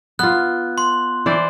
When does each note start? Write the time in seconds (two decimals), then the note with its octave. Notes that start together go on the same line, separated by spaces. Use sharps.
0.19 B3 F4 F#6
0.78 C6
1.26 E3 C5 D5